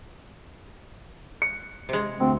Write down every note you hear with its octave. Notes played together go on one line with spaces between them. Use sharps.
C#7
C3 G#3
D2 C4